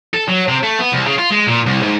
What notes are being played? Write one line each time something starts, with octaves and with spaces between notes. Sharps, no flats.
A4
F#3
C3
A3
B3
C2
C#3
F4
G#3
A#2
C2
G#2